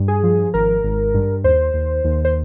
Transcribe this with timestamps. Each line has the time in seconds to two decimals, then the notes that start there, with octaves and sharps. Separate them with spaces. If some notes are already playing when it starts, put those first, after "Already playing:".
Already playing: G2
0.08 G#4
0.23 F3
0.54 G#1 A#4
0.84 G#1
1.14 G2
1.44 D#2 C5
1.74 D#2
2.04 D#2
2.25 C5